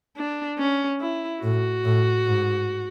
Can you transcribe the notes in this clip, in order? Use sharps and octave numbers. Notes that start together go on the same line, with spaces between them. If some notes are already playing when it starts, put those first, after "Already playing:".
D4
C#4
E4
A2 F#4
A2
G#2